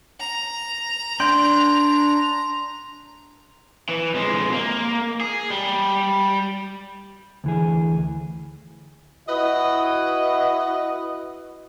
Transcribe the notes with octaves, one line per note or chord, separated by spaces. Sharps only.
A#5
D4 G5 C6
E3
F2 G#3
A#3
G#4
G3
D2 E3 G#4
E4 F#4 B4 D#5